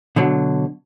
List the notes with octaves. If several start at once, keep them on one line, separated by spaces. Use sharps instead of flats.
B2 D3 F#3